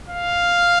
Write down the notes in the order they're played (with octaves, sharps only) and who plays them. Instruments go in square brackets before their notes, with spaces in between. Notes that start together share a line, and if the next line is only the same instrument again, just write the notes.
[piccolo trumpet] F5